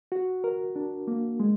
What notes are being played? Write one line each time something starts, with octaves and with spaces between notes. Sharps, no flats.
F#4
A#4
D4
A#3
G#3